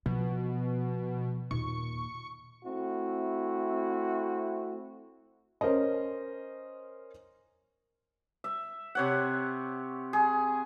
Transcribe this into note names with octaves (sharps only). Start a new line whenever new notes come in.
B2 F3
D#2 A#2 C#6
A3 C4 E4 F#4
C#4 A#4 C5 D#5
E5
C3 C#5 F#5
G#4